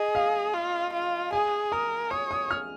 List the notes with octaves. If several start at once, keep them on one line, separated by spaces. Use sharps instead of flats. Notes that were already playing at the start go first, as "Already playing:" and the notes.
Already playing: G#4 D#5
F5
F4
F4
G#4 G#5
A#4 D#6
C#5 D#6
D#6
F6